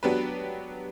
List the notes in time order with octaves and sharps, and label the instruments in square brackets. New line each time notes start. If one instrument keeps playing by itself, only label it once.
[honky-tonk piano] F#3 B3 D4 G4 B4